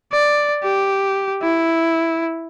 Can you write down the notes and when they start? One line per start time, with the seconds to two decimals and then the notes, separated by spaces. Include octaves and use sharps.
0.12 D5
0.64 G4
1.43 E4